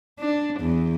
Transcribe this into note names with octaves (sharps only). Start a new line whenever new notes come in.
D4
E2